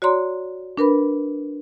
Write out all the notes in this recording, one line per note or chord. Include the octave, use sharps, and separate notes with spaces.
F#4 C#5 D5 A#5 C6
D4 A#4 B4 B5